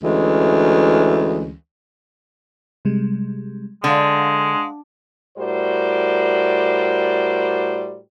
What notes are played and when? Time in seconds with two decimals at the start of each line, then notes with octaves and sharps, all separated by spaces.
0.03 D2 E3 G#3 C#4
2.85 C3 G3 G#3
3.84 D3 G#3 F5 F#5
5.38 A2 G3 F#4 A#4 C5 D5